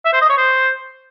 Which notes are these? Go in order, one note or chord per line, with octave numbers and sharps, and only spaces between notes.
E5
C5
D#5
C#5
C5